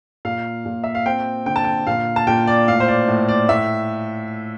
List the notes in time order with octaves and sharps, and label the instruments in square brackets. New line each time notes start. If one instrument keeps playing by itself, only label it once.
[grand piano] A#2 F5
A#2
E5
F5
C4 G5
D3 G5
A5
G5
A#2 F5
A5
A#2 G5
D5
A2 F5
C5
D5
A2
D5
A2 E5